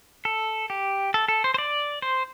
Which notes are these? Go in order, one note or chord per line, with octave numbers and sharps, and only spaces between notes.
A4
G4
A4
A4
C5
C5
D5
C5